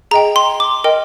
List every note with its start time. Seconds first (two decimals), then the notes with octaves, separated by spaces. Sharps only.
0.11 G#4 D#5 G5 A#5
0.36 C6
0.60 D6
0.84 A#4 D#5 G5